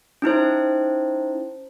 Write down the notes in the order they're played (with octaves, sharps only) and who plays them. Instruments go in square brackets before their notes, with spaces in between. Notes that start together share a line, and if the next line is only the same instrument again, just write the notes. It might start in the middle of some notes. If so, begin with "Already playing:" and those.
[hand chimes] C#4 D#4 E4 C5